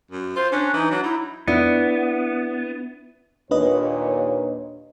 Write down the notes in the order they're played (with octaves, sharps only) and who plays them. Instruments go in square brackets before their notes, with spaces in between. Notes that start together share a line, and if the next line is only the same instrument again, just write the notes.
[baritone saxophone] F#2
[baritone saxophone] F4 [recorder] C5
[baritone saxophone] C#4 [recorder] D4
[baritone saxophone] E3 [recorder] D#4
[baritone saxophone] F#3 [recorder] D4
[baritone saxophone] D#4 [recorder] E4
[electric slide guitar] B3 [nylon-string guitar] D4 E4
[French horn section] D#2 A#2 C#5 [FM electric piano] D4 B4 D#5